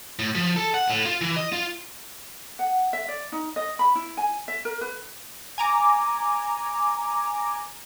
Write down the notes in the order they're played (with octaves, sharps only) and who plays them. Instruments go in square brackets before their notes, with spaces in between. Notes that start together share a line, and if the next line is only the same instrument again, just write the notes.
[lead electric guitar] A2
F3
A4
F#5
A2
F4
E3
D#5
F4
[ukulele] F#5
E5
D5
D#4
D#5
B5
E4
G#5
E5
A#4
B4
[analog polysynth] G#5 A#5 D6